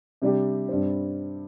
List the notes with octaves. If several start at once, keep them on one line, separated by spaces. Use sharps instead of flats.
C3 G3 D4 G4
G2 G3 C4